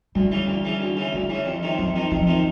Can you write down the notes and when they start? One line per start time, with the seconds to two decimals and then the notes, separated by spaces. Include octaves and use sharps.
0.15 D2 G3
0.32 C#3 E3
0.47 D2
0.65 C#3 E3
0.81 D2
0.97 C#3 E3
1.13 D2 G3
1.30 C#3 E3
1.46 F2
1.63 C3 D#3
1.78 F2 F#3
1.96 C3 D#3
2.11 F2 F3
2.27 C3 D#3